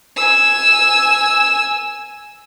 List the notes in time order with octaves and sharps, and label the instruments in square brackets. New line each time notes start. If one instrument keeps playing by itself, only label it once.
[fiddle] G#5 E6